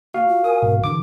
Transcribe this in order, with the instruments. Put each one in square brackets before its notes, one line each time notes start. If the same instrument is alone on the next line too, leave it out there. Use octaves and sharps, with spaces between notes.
[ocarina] A#3 [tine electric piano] F#4 F5
[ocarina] F4
[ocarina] A#4 [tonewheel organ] G#5 D#6
[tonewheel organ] G#2 B2
[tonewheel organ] D3 E3 [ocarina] D4 [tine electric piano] D6